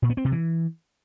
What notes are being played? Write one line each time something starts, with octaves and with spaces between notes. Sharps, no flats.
A#2
B3
C4
C3
E3